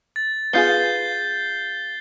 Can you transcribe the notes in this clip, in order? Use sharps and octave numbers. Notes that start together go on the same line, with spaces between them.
A6
B3 F4 G#4 G6 C7 G7